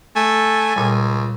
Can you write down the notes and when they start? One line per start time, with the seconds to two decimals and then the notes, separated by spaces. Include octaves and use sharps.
0.16 A3 G#5
0.76 C#2 A#2 G3